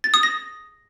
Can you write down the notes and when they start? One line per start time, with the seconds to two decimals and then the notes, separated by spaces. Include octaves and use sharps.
0.04 A6
0.14 D#6
0.23 A#6